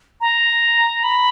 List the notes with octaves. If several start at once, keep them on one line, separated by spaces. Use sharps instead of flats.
A#5
B5